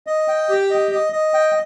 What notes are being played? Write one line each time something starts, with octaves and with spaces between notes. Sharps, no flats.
D#5
G5
G4
D#5
D#5
D#5
G5